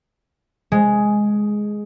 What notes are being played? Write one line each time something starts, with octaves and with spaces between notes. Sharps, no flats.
G#3